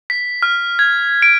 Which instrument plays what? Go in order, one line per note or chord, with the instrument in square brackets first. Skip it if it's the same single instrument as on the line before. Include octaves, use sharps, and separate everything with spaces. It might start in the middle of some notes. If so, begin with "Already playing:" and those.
[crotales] B6
F6
G#6
D7